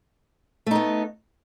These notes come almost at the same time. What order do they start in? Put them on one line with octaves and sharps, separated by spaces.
A3 D#4 B3